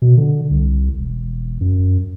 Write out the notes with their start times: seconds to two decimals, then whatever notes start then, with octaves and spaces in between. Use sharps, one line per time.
0.02 B2
0.17 D3
0.51 C2
0.98 E1
1.61 F#2